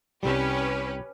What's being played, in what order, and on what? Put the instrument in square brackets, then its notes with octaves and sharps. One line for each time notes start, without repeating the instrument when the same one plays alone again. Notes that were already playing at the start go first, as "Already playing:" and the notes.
[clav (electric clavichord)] C2 G3 [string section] C#4 G4 B4